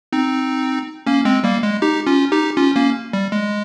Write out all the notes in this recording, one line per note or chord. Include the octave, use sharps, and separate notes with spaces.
C4 D#4
A#3 C#4
G#3 C4
G3 A#3
G#3
D#4 G4
C#4 F4
D#4 G4
C#4 F4
A#3 C#4
G3
G#3